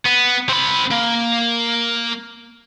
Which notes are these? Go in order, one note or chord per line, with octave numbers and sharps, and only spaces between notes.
B3
C4 B5
A#3